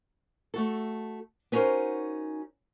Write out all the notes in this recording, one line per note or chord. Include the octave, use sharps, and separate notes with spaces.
A3 F#4 A4
B3 C#4 D#4 F#4 A#4 C5